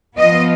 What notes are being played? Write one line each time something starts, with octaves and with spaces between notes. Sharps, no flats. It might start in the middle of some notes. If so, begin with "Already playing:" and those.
F3 B3 F4 D#5